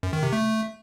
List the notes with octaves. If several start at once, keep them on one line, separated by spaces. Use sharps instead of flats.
F#2
D#3
C3
A3